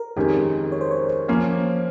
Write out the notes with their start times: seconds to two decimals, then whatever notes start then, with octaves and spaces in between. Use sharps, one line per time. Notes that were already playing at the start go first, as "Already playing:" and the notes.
Already playing: A#4
0.16 F2 D#3 G#3 C#4 G4
0.72 C#5
0.81 C5
0.91 C#5
1.28 F3 A#3 C#4